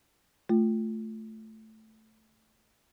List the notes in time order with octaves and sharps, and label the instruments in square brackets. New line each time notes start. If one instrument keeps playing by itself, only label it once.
[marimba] A3 F4